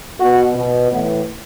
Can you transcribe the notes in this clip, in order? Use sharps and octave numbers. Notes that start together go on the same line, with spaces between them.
B2 F#4
B2
A2 E3 B3